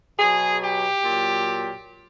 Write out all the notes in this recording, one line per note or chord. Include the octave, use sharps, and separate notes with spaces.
B2 F#3 G#4
G4
A#2 F#3